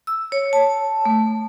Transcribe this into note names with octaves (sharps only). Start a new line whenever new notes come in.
E6
C#5
A5
A3